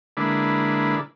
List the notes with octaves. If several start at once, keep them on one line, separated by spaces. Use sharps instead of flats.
D3 G#3 A#3 D4 E4 B4